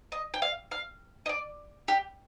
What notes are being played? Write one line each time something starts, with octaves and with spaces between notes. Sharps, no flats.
D#5
G5
F5
F5
D#5
D5
G4